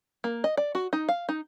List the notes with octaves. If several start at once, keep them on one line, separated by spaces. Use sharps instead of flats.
A#3
D#5
D5
F#4
D#4
F5
D#4